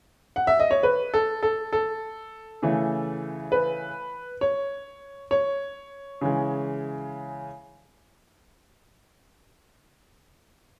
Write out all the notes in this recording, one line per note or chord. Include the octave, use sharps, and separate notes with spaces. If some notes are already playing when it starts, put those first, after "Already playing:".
F#5
E5
D#5
C#5
B4
A4
A4
A4
C#3 E3 A3
B4
C#5
C#5
C#3 E3 G#3